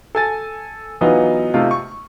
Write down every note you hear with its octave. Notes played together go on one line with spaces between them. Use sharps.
A4 G#5 A6
E3 F#3 B3 D#4 F4
C3 A3 D#4 F4
C#6